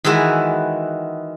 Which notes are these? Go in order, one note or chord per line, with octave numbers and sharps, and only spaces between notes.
D#3 E3 G#3 E4 F#4 B4